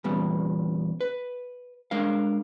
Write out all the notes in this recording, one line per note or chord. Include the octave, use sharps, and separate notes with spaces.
E2 A#2 G3 B3
B4
G#3 D4 A#4 F5